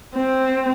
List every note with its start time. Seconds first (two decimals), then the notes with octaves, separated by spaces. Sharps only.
0.15 C4